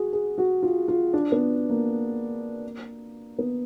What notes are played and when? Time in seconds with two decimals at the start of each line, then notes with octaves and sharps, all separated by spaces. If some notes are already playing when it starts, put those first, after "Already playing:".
Already playing: F#4 G#4
0.13 G#4
0.38 F#4
0.63 F4
0.88 F4
1.13 D4
1.32 B3
1.70 A#3
3.39 B3